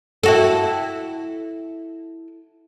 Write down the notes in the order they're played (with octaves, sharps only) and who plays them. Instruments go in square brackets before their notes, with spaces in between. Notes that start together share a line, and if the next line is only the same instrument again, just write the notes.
[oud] E4 F#4 A4